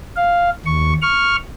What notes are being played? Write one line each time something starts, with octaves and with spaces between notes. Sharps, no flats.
F5
D#2 C#6
C#6 F6